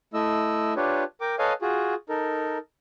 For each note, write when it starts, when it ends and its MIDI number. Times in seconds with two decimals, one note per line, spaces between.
0.14 0.74 57
0.14 0.74 64
0.14 0.74 75
0.14 0.74 88
0.76 1.04 62
0.76 1.04 65
0.76 1.04 67
0.76 1.04 71
0.76 1.04 73
1.21 1.35 70
1.21 1.35 79
1.21 1.35 86
1.39 1.53 69
1.39 1.53 71
1.39 1.53 73
1.39 1.53 75
1.39 1.53 77
1.39 1.53 80
1.62 1.94 65
1.62 1.94 66
1.62 1.94 68
2.09 2.58 63
2.09 2.58 69
2.09 2.58 70